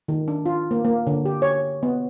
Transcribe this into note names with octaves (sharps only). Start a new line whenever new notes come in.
D#3
D4
F4
A#3
A#3
D3
G4
C#5
B3